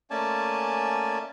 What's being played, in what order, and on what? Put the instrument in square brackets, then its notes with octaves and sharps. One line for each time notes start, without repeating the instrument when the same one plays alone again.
[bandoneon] A3 A#3 C#4 D5 G#5 A5